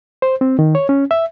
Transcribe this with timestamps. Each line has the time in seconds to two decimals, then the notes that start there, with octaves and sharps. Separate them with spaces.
0.22 C5
0.41 C4
0.59 D#3
0.75 C#5
0.89 C#4
1.11 E5